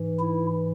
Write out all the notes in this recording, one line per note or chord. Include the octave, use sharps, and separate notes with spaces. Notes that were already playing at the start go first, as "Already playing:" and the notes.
Already playing: G#2 E3
E4